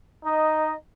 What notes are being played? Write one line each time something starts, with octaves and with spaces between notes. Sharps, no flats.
D#4 D#5